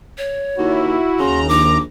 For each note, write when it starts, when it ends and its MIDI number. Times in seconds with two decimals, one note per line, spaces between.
0.18 0.80 73
0.58 0.97 39
0.58 1.19 64
0.58 1.51 66
1.19 1.78 39
1.19 1.46 49
1.19 1.78 82
1.19 1.41 84
1.49 1.81 34
1.49 1.80 86